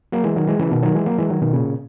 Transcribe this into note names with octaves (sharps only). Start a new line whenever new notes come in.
F#3 A#3
E3 G#3
D#3 F#3
E3 G#3
C#3 E3
B2 D#3
D#3 F#3
E3 G#3
F#3 A#3
E3 G#3
D#3 F#3
B2 D#3
A#2 C#3